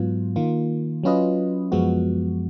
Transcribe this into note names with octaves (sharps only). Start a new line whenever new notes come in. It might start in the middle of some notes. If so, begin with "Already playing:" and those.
Already playing: G#2 F#3 B3 F4
D#3 A#3 F4
F#3 C#4 F4 B4 D#5
F#2 F3 G#3 B3 F#4